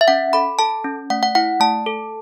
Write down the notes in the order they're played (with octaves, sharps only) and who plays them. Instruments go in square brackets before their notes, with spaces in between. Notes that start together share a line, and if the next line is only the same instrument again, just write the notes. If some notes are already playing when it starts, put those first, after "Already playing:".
[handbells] E5
C#4 F#5
A4 B5
A4 A5
C#4
A3 F#5
F#5
E4 F#5
A3 A5
A4